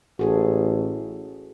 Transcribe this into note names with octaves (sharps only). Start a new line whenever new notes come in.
A1 F#4 G#4 A4